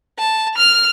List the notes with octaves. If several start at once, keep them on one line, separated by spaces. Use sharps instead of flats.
A5
F6 F7